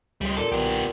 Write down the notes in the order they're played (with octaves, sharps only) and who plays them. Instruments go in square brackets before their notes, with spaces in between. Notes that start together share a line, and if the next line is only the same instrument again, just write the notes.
[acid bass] C#2 [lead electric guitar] G3 G#3
[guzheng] A#2 [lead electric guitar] A4
[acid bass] B1 [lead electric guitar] B3 G4